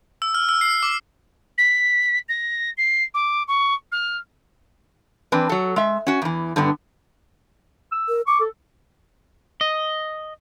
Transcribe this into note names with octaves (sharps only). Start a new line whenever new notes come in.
E6
F6
E6
C7
D6
B6
A#6
C7
D6
C#6
F6
E3 C4 D4 B4
F#3 A4
G#3 E5
C#4 F#4
E2 E3
G2 D3 B3
E6
A#4
C#6 D6
A4
D#5